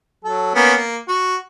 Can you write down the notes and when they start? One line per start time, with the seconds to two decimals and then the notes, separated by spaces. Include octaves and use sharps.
0.25 F#3 A4
0.55 A#3 B3 C#4
0.76 A#3
1.08 F#4